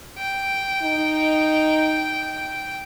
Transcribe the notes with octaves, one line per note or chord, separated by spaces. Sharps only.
G5
D#4